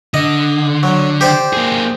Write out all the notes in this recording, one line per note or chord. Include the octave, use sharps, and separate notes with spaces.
D3 D#5
F#3
G4 C5 D5
A#3 G#4